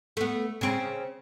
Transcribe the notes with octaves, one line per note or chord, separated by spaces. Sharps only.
A3 B3
C#3 C4